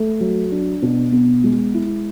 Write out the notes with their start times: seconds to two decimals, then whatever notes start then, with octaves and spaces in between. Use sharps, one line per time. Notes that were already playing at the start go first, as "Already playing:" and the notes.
Already playing: A3
0.20 F#3
0.52 D4
0.82 B2
1.12 B3
1.44 G#3
1.74 E4